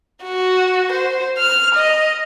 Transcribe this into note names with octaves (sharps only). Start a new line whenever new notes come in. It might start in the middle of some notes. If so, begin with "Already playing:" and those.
F#4
C5
F6
D#5